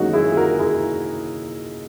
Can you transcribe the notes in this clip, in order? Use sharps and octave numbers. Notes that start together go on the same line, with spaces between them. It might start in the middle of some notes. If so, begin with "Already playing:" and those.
Already playing: D#3 E3 F#3 G#3 A#3 C#4 D#4 F#4
E4 G#4
G#4
F#4 A#4
E4 G#4